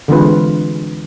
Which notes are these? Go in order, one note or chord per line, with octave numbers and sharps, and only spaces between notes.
D3 E3 G#3 C4 F4 B4